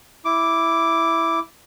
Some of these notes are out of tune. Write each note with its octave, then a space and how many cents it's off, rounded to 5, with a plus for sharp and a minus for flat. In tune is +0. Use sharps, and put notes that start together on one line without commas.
E4 +0 D6 -5